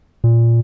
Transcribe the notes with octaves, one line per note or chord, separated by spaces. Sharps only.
A#2